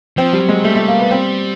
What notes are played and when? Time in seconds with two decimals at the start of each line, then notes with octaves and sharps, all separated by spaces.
0.17 F3 C4
0.33 G3
0.40 F#3
0.49 G#3
0.64 G3 A3
0.76 A3
0.88 A#3
0.99 B3
1.11 C4